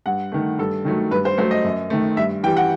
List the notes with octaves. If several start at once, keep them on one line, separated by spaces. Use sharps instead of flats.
G2 F#5
D#3 A3
G2 A4
D#3 F#3 A3
G2 B4
C5
F#3 A3 C5
D#5
F#2
D#3 A3
G2 E5
E3 G3 G5
F#5